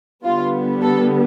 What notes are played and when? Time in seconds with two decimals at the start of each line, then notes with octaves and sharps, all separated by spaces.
0.24 D3 G3 B3 F4
0.81 A4